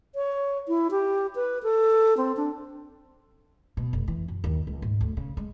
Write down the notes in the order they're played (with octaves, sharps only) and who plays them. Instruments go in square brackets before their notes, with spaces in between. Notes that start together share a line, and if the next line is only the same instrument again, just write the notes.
[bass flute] C#5
E4
G4
B4
A4
C4
D4
[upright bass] B2
F1
E3
F#2
D#2
C#2
G#2
D2
C#3
G#3